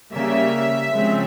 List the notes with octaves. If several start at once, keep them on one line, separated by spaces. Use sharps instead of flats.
C#3 G3 A#3 E5
C#3 F3 G#3 C4